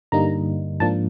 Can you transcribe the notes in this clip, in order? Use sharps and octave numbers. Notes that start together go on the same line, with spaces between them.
G2 D3 G3 A#3 D#4 A#5
G#2 F3 A#3 D4 A5